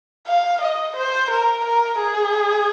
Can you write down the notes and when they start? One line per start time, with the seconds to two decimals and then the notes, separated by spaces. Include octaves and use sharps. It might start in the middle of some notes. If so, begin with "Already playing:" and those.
0.27 F5
0.61 D#5
0.96 C5
1.30 A#4
1.64 A#4
1.98 G#4